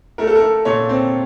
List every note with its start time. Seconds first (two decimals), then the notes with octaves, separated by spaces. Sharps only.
0.18 A3 A#4
0.27 A4
0.35 A#4
0.42 A3
0.65 A#2 C#5
0.89 C4